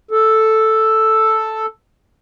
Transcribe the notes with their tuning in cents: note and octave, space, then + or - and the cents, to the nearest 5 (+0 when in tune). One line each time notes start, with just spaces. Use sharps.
A4 +0